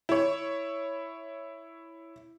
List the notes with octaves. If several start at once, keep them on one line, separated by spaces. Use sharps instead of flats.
E4 C#5